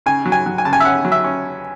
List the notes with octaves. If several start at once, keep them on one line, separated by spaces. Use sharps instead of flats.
C#3 G#5
F#3
G#5
F#3
G#5
C#3 A5
G#5
E5
C#4 F#5
F#3
E5
C#4